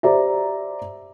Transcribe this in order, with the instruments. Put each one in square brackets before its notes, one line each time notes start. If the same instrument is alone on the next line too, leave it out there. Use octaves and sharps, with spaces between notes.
[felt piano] G4 C5 D5 E5 A#5